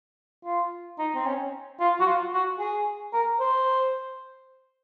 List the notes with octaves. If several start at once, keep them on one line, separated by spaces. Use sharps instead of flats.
F4
D#4
C4
C#4
F4
F#4
F4
F#4
G#4
A#4
C5